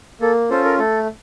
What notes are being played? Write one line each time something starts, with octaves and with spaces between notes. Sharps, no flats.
A#3 A4
C#4 F4 A4 C5
A#4
A3 A4